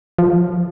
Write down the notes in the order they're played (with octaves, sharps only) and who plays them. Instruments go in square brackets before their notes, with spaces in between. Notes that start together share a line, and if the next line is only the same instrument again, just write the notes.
[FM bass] F3